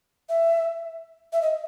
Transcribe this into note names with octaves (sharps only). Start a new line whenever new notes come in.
E5
E5
D#5